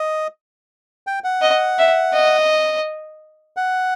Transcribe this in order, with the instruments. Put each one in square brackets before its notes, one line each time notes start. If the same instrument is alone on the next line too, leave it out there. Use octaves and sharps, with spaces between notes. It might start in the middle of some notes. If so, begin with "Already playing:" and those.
Already playing: [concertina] D#5
G5
F#5
[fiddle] D#5
E5
D#5
[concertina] F#5